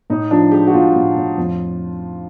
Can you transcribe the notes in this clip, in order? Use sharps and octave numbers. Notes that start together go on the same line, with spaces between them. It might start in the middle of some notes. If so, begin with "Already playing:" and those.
A2 D#4
F3 D4
G#3 G4
F#4
A2 F4
A2
A2
F2